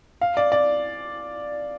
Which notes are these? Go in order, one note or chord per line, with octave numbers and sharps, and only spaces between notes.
F5
D5
D5